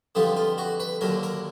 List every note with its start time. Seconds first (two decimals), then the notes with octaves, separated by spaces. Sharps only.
0.15 F2 D3 G3 B3 F4
0.37 F4
0.58 F#4
0.80 B4
1.01 D#2 D3 F#3 A#4
1.23 A#4